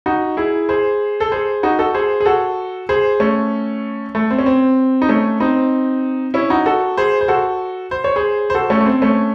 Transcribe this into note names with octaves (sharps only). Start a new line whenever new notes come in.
D#4 F#4
E4 G#4
G#4 C5
A4
G#4 C5
D#4 F#4
F#4 A4
G#4 C5
G#4
F#4 A4
G#4 C5
A3 C#4
A3
C4
C#4
C4
D#4
A3 C#4
C4 D#4
C#4 E4
D#4 F#4
F#4 A4
G#4 C5
C5
F#4 A4
C5
C#5
G#4 C5
C5
F#4 A4
A3 C#4
A3
C4
A3 C#4